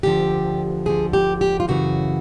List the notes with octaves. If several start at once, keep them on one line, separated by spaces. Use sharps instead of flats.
D2 D3 F3 G4
D2 D3 F3 G#4
G4
G4
F4
F#2 C#3 E3 F#4